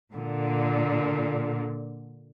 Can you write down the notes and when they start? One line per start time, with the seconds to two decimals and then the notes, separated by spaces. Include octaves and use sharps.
0.11 A#2 D3